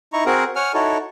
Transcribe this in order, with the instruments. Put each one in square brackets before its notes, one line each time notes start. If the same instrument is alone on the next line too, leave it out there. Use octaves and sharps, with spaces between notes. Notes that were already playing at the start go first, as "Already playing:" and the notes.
[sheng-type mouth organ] D#4 E4 A#5 C#6
C4 F#4 G#4 A#4
C#5 F#5 G#5 F6
D#4 E4 F#4 A4 C#5